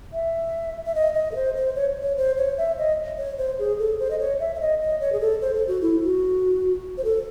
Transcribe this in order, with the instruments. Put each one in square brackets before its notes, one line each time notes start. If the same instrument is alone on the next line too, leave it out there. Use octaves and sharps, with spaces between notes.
[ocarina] E5
E5
D#5
D#5
A4
C5
C5
C#5
C#5
C5
C#5
E5
D#5
C#5
C5
G#4
A4
C5
D#5
C#5
E5
E5
D#5
D#5
C#5
G#4
A4
C5
A4
F#4
E4
F#4
C5
A4